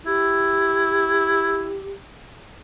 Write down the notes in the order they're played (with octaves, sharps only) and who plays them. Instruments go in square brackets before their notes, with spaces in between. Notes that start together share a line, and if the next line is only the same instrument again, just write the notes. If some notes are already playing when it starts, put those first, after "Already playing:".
[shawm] E4 [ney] G4